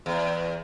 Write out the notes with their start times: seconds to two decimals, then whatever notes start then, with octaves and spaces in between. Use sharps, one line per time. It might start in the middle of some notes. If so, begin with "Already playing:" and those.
0.06 E2